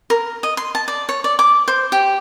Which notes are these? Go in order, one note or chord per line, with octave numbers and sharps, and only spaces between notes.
A#4
D#5
C6
A5
D5
C#5
D5
D6
C5
G4